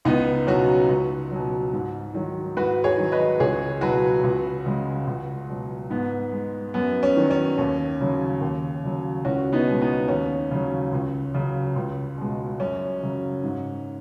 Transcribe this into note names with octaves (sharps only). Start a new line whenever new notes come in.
C#2 B3 D#4
B2 F#3 C#4 F#4
C#2
B2 F#3
G#2
D#3 F#3
G#2 F#4 B4
G#4 C#5
D#3 F#3
B4 D#5
C#2 G#4 C#5
B2 F#3 F#4 B4
C#2
C#3 G#3
C#2
B2 F#3
G#2 B3
G#3
F#2 B3
C#4
D#3 F#3
C#4
D#2
C#3 F#3
D#2
C#3 F#3
C#2 C#4 F#4
B3 D#4
B2 G#3
B3 D#4
D#2 C#4
C#3 F#3
C#2
C#3 F#3
C#2
B2 G#3
F#2 C#4
C#3 F#3
G#2